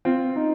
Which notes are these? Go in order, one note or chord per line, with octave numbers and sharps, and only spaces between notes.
C4 F4
D#4